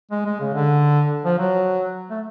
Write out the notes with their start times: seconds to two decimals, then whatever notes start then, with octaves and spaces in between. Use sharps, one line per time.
0.11 G#3
0.26 G#3
0.40 C#3
0.55 D3
1.25 F3
1.39 F#3
2.10 A3